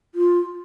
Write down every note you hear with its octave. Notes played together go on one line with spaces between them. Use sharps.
F4